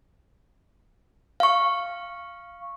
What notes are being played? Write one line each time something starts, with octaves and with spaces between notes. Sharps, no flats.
F5 C#6